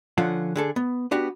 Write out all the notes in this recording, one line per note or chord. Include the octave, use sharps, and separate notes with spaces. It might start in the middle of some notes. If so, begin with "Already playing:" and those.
D3 F3 C#4 F4 F#5
D3 G#4 A4
B3
B3 D4 F#4 G4